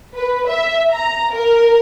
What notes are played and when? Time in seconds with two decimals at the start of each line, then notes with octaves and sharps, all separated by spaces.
0.14 B4
0.47 E5
0.91 A#5
1.33 A#4